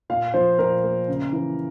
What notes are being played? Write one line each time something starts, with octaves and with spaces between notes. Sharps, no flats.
A#2 F5
F3 C5
A#2 A#4
A#3
C#3
E3